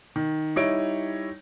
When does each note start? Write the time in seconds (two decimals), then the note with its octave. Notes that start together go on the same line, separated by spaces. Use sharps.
0.16 D#3
0.56 G3 D#4 E4 C#5 D7